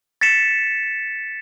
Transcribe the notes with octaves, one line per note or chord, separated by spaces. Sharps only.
A6 B6 C#7 E7